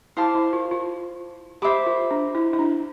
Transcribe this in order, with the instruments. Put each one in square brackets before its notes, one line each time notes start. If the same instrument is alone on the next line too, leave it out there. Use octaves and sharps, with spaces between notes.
[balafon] E4 [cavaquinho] C5 F5 A5 D6
[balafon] E4
F4
F4
[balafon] G4 [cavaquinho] C5 E5 B5 D6
[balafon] F4
D4
E4
E4
D4